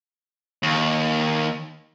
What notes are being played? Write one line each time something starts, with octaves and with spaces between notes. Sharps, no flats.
D#2